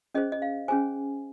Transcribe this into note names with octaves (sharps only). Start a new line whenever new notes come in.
C#4 G#4 C5 D#5
D#5
F5
C#4 G#4 C5 G#5